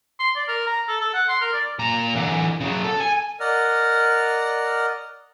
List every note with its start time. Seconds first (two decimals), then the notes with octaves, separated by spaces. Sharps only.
0.19 C6
0.36 D5
0.48 A#4
0.67 A#5
0.88 A4
1.01 A4
1.14 F#5
1.28 C6
1.41 A#4
1.53 D5
1.79 A#2 A#5
2.15 D3 E3
2.60 C#3 F#3
2.84 A4
3.00 G#5
3.40 A#4 D5 D#5 F#5 F6